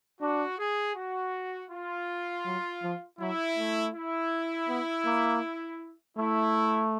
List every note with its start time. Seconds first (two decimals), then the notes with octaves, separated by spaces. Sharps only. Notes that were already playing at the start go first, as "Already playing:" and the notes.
0.21 D4 F#4
0.59 G#4
0.96 F#4
1.71 F4
2.45 F#3
2.83 F3
3.19 F#3 E4
3.57 A3
3.94 E4
4.68 B3
5.05 A#3
6.17 A3 E4